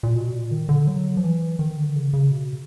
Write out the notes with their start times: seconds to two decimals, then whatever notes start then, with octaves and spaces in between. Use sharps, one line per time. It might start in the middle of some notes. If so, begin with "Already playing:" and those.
0.03 A#2
0.15 B2
0.33 A#2
0.51 D#3
0.69 D3
0.87 F#3
1.17 F3
1.23 E3
1.59 D#3
1.77 D3
1.95 C#3
2.13 C#3
2.31 B2